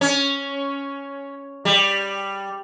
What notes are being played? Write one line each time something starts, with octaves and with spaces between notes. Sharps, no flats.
C#4
G3